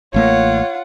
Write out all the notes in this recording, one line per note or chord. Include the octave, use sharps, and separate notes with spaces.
A1 A3 A#3 F4 C#5 F#5